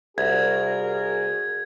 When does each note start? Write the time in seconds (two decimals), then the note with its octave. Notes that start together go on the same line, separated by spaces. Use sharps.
0.18 C2 F#4 G#4 A#4 G#6